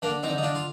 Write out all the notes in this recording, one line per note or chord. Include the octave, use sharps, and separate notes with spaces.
D3 A#3 D4
C4 D#4
D3
D#4
D4 F4
F4